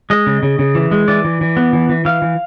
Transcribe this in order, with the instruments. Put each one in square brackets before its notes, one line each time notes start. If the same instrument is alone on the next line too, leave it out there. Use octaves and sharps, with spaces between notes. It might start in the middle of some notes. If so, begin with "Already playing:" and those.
[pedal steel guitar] G#3 D#5
C#3
C#3
C#3
E3
G#3
E3 D5
E3
E3
B3
E3
E3
E3 F5
E3